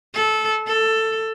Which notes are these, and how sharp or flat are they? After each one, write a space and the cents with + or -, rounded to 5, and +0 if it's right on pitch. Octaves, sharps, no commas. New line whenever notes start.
A4 -20
A4 +10